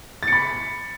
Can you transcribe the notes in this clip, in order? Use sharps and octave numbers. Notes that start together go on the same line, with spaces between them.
B5 A6 C#7